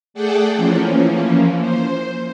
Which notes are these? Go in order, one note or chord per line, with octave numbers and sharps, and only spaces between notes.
A3 G#4 A4 D5 F#5 G5
E3 F3 A#3 C#4
C5